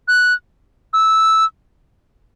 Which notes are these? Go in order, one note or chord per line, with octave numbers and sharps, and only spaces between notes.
F#6
E6